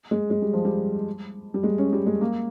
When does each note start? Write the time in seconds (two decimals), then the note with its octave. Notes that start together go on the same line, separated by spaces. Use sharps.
0.11 G#3
0.30 G#3
0.42 G3
0.53 F3
0.65 G3
1.54 G3
1.63 G#3
1.78 C#4
1.93 G3
2.06 G#3
2.21 A#3